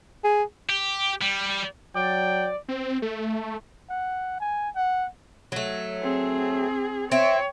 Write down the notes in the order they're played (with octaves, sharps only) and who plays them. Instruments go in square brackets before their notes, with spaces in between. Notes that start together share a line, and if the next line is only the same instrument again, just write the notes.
[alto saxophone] G#4
[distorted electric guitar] G4
G3
[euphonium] F#3 [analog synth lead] D5 [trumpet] G5
[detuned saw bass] C4
A3
[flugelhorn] F#5
G#5
F#5
[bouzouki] F#3 A3
[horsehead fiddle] C4 G#4
[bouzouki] C4 [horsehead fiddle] C#5 [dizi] E5